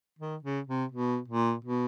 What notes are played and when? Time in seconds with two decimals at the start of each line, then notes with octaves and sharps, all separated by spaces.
0.19 D#3
0.43 C#3
0.67 C3
0.92 B2
1.28 A#2
1.65 B2